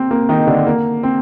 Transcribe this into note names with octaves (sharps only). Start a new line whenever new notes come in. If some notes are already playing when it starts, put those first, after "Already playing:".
Already playing: A#3 C4
A#3
D#3 D#4
D3 D4
A#3
C4